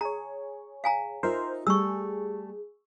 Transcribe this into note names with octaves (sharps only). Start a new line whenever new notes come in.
G#4 C#5 A#5
F5 G#5 A#5
D#4 F4 A#4 C5 E5
G3 A3 G#4 C#6 E6